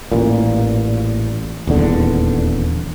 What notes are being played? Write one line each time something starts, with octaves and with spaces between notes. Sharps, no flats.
A1 A#2
D#1 E2 D3